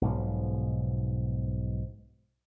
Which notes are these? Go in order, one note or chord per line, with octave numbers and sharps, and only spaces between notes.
B1 G#2 B2 F3